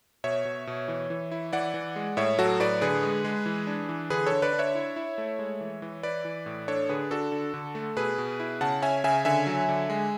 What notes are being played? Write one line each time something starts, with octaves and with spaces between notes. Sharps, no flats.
B2 C#5 E5
B2
B2
E3
E3
E4
E3 D5 F#5
E3
G#3
A2 C#5 E5
F#3 F#4 A4
A2 B4 D5
D3 G#4 B4
G#3
G#3
E3
D4
E3
D3 G#4 B4
A4 C#5
D3
B4 D5
D4
C#5 E5
E4
E4
A3
G#3
E3
E3
E4 B4 D5
E3
A2
D4 A4 C#5
D3 G#4 B4
D4 F#4 A4
D3
D3
A3
B2 G#4 B4
B2
E4
C#3 F#5 A5
C#4 E5 G#5
C#3 E5 G#5
D3 E5 G#5
F#3
D3
G#3